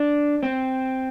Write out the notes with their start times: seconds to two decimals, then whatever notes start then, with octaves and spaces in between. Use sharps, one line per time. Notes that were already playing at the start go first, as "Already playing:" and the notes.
Already playing: D4
0.43 C4